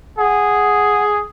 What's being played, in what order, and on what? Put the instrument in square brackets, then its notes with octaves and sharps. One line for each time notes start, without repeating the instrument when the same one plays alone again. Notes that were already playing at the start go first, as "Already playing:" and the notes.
[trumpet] G#4 [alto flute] F#5